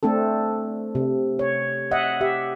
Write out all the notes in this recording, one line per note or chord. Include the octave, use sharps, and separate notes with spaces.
A3 C4 D4 A4
C3
C#5
D#5 E5 F#5
G4 E5